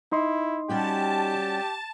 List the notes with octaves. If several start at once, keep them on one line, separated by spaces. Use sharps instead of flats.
D#4 E4 D#5 C6
G3 C#4 F#4 G4 A5